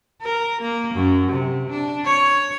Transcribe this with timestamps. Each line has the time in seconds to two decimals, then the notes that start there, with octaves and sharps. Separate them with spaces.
0.22 A#4
0.62 A#3
0.94 F#2
1.32 C3
1.69 D4
2.05 C#5